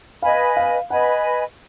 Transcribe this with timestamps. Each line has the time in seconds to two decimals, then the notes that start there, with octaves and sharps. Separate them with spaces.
0.22 B4 D#5 F5 G#5 B5
0.57 F5
0.90 B4 D#5 F#5 G#5 B5